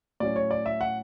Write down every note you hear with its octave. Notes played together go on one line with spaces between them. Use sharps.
A2 F#3 C#4 D5
C#5
D5
E5
F#5